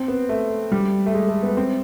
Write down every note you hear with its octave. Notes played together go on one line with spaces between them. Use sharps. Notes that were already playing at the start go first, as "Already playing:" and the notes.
Already playing: C4
B3
A3
G3
A3
G#3
A3
B3
C4